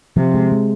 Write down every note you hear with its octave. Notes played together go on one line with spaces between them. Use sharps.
C3 F3
G#3
G#3